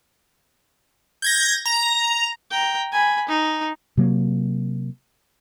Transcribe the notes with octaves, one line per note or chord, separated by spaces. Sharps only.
G6 G#6 A#6
A#5
G5 A#5
G#5 B5
D#4
C3 F#3 A#3